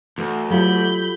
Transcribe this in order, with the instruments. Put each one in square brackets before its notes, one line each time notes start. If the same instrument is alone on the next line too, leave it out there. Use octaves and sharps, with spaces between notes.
[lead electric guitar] D2 [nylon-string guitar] E3
[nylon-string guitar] F#3 F5 [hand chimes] F4 G4 A4 [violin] B5 G6